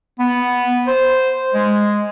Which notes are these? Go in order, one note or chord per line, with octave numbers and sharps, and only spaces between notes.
B3
C5
G#3